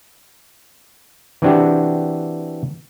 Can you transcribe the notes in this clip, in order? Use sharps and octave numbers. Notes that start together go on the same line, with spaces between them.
E3 C4 D4 F#4 G4